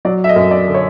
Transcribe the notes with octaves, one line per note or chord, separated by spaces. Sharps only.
F#3 D5
E5
D#5
F#2
D5
D3
C#5